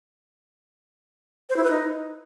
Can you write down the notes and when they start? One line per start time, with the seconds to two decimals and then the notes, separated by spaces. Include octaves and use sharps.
1.50 C5
1.57 E4
1.64 B4
1.71 D#4